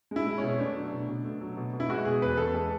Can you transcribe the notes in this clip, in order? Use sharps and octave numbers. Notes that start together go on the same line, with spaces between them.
G#3 E4
G#3
C#4
B2
A3 D4
F#3
B2
B2
A3
F#3
B2
B2
E4
G#3 F#4
B2 G#4
E2 B4
E2 A4
G#3 A4